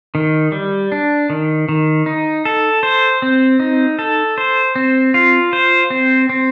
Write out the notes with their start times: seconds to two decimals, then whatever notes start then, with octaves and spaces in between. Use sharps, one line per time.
0.15 D#3
0.52 G3
0.92 D4
1.30 D#3
1.69 D#3
2.06 D#4
2.45 A4
2.83 C5
3.22 C4
3.60 D#4
3.99 A4
4.38 C5
4.76 C4
5.14 F4
5.53 C5
5.90 C4
6.29 C4